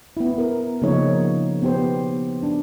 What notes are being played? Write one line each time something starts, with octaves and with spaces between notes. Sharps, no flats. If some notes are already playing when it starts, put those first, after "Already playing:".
B3 E4
A#4
C#3 F3 A#3 D#4 C#5
B3 G4 C5
D4